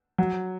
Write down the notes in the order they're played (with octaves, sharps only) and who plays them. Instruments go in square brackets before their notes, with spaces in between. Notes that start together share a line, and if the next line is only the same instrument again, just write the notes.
[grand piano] F#3